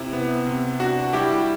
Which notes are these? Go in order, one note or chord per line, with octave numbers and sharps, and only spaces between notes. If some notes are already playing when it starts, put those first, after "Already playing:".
Already playing: C3 E4
B3
C3
D4 F#4
G3 E4 G4